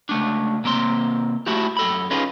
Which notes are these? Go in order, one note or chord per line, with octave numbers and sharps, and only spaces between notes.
C#2 A3 D4
C3 A#3 C4 C6
A3 E4 F#4 G4
F#2 A4 B5
C#4 D#4 F4 G#4 B4